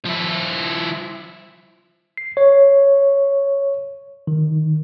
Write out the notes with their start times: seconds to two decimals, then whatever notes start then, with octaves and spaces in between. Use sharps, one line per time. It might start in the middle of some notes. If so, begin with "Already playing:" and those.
0.05 F3 E4
2.17 C7
2.37 C#5
4.27 D#3